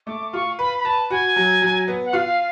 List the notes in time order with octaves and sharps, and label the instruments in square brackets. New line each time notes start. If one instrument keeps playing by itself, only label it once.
[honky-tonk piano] A3 [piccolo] D6
[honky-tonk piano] F4 [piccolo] C#6
[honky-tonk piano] B4 [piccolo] B5
[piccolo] B5
[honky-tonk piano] B4 [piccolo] A5
[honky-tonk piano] F#4 [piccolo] G#5
[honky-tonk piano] F#3
F#3
B3
[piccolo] F#5
[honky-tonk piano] F4 [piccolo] F5